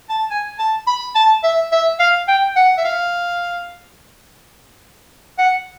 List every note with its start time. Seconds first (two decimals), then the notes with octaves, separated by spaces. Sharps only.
0.09 A5
0.30 G#5
0.59 A5
0.87 B5
1.15 A5
1.43 E5
1.72 E5
2.00 F5
2.28 G5
2.56 F#5
2.77 E5
2.84 F5
5.38 F#5